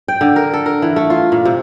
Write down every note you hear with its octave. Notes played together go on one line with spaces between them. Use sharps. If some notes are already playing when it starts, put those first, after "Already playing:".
G5
D3
A#4
A4
A#4
E3
A3
F4
A#2
C3